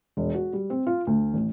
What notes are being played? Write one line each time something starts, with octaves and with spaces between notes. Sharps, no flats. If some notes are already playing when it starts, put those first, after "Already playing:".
E1
F#4
G3
C4
F4
D2
A1